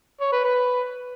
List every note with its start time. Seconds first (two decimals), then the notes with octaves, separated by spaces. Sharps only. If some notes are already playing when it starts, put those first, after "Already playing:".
0.20 C#5
0.32 B4
0.44 B4